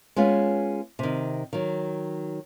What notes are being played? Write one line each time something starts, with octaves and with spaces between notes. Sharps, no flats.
G#3 B3 C#4 F4
C3 D#3
D#3 F#3